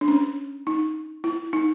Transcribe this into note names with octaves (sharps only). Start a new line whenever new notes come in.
D4
C#4
D#4
E4
D#4